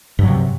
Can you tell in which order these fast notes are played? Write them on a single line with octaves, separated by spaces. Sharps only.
G2 F#3 C3